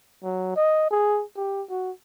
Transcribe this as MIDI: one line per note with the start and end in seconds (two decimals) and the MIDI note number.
0.23 0.53 54
0.56 0.86 75
0.91 1.23 68
1.37 1.63 67
1.69 1.91 66